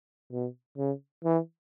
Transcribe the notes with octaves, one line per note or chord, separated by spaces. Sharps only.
B2
C#3
E3